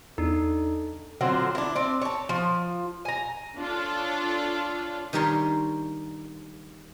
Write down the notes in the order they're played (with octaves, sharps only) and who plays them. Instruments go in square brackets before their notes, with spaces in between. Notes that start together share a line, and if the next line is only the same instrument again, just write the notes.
[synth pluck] E2 [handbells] D4 D#4 [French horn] A4
[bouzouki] D3 F#3 C4 F4
D4 E4
C4 D5
C#5 A5
F3
G#5 A#5
[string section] D4 F4 A4 C#5
[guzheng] D#3 G3 D4 A#4 C#5 C6